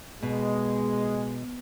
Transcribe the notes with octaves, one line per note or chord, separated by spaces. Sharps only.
B2 G#3